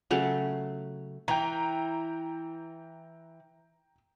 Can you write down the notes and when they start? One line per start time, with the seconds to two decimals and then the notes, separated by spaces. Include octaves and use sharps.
0.11 C#3 F#3 A3
1.28 E3 G5 A#5